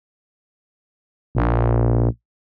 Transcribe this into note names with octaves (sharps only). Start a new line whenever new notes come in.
A#1